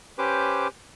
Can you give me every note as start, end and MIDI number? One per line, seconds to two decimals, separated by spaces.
0.19 0.67 61
0.19 0.67 67
0.19 0.67 71
0.19 0.67 72
0.19 0.67 86